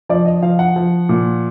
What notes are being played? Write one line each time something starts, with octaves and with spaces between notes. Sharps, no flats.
F3 D5
D#5
F3 F5
F#5
F3
A#2